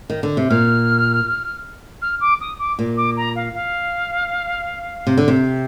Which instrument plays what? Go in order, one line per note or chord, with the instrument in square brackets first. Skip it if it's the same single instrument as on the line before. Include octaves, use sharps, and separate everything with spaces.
[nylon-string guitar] D#3
D3
C3
[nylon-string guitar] A#2 [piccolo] F6
[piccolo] F6
D6
D#6
D6
[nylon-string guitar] A#2
[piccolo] D6
A#5
F5
F5
[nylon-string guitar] C3
D3
C3